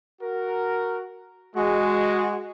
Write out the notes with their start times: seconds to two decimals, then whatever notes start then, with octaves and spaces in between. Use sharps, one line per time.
0.21 F#4 A#4
1.56 G#3 F#4